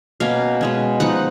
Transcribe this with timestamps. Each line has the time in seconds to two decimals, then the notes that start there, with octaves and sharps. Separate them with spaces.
0.20 B2 A#3 C#4 F5
0.61 B2 G#3 C#4
1.00 F3 B3 D#4 F#5